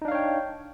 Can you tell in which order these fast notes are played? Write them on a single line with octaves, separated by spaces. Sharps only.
D#4 D4 F5 C#5 G5